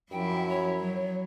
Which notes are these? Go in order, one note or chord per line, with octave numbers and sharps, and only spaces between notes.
F#2 F3 E4 G5
C#5
F#3